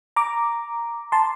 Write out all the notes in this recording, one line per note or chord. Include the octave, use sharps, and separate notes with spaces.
A#5 D6
A5 C6